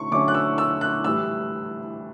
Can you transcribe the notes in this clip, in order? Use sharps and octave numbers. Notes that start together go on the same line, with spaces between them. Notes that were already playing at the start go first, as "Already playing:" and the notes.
Already playing: D3 A3 C#4 C#6
D3 F#3 A3 C#4 D6
F#6
E6
E6
F#6
A2 E3 G3 E6